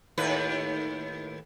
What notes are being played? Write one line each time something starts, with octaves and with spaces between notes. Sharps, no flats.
D#2 A2 B4